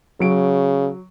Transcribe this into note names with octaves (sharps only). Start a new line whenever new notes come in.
C#3 F#3 D7